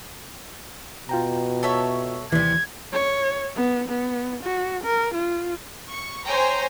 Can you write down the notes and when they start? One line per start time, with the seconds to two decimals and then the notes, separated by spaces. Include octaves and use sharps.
1.09 B2 F4 G5 A#5
1.63 A4 C#5 E5
2.32 D#2 C3 E3 G3 G#6
2.92 C#5
3.56 B3
3.89 B3
4.43 F#4
4.84 A#4
5.14 F4
5.89 C#6
6.25 C5 C#5 G5 G#5 A#5